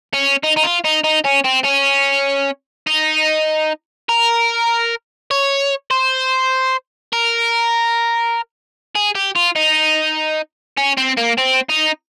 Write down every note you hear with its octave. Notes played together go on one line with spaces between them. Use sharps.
C#4
D#4
D#4
F4
D#4
D#4
C#4
C4
C#4
D#4
A#4
C#5
C5
A#4
G#4
G4
F4
D#4
C#4
C4
A#3
C4
D#4